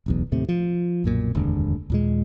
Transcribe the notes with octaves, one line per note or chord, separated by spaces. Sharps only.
D1 B1 E2
D#2 A2 C3
F3
B1 F#2 A#2
F1 D#2 G#2 D3
D#2 A#2 G#3